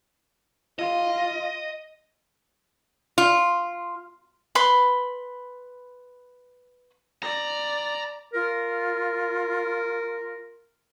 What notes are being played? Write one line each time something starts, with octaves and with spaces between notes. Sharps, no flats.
F4 D#5
F4
B4 B5 C6
D5 A#5
F4 A#4